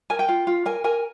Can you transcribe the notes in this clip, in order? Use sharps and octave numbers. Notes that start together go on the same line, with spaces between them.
A#4 G#5
G5
F4
F4
A#4 G#5
A#4 G#5